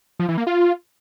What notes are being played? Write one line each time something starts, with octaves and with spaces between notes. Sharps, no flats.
F3
E3
A#3
F4